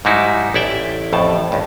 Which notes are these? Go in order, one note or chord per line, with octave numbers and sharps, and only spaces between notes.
G#2 F#3 G3 D#4 E4 F#4
A1 E4 D5 E5 G5
A1 F2 A2 A5
C#2 G2